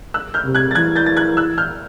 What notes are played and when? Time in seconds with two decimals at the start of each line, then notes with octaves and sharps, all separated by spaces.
0.14 E6 F#6
0.34 F6 G6
0.45 C3
0.55 F#6 G#6
0.71 A6
0.75 E3 F#6 G#6
0.96 G6 A6
1.06 A6
1.17 F#6 G#6
1.37 E6 F#6
1.58 F6 G6